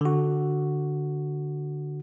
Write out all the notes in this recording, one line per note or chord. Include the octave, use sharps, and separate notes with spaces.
D3 F#4